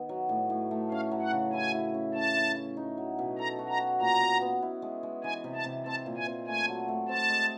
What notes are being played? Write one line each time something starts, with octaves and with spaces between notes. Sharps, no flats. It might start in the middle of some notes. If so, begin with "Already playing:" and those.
Already playing: D#3 B3
F#3
A2
A2
A3
C#4 F5
F#3
F#5
C#3
E4 G#5
E4
C#4
C#4 A5
E4
E4
D#4
F#3
B2
A4 A#5
F#4
A#5
F#4
A#2 A#5
B3
B3
E4
G#3
G#3
E3 G#5
C3
A5
C3
C4 A5
A#2
G#5
C4
A3 G#5
F#3
A3
C4 A5
G#3